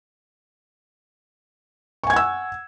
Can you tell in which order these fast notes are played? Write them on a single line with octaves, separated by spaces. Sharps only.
C#6 G#5 G#6 F#5 E6